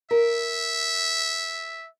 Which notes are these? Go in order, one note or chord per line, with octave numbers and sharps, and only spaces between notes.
A#4 E5